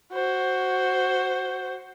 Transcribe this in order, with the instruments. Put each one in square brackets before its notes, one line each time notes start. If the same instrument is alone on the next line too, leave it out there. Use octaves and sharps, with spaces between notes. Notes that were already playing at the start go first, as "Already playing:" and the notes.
[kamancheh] F#4 C5